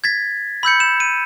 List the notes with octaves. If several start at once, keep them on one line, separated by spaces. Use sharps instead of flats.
G#6 A6 B6
B5 E6 G6 C#7
E7
D#7